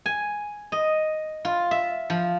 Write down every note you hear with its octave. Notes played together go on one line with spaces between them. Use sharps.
G#5
D#5
F4
E5
F3